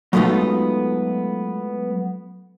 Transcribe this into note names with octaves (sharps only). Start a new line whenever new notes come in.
F#3 G#3 A3 B3 D#4 F4